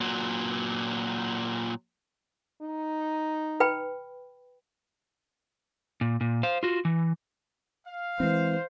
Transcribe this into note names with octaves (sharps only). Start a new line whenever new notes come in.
A#2 F#3
D#4
B4 G5 B5
A#2
A#2
C5 F5
F4 F#4
E3
F5
E3 G#3 C4 C5